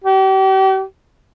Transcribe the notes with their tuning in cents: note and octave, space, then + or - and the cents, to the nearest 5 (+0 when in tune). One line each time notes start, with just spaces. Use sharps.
G4 -40